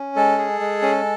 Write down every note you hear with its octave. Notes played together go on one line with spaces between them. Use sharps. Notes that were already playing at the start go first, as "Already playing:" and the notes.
Already playing: C#4
G#3 A4
G#4
G#3
C#4